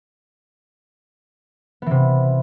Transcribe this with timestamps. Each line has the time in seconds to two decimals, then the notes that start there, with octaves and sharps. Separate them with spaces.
1.82 B3
1.86 E3
1.91 C3